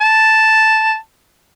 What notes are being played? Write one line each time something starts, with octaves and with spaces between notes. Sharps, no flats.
A5